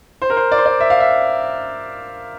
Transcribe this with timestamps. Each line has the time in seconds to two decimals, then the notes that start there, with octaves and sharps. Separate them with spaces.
0.22 C5
0.30 A#4
0.37 C5
0.52 D5
0.58 C5
0.66 D5
0.80 E5
0.90 F5
1.00 E5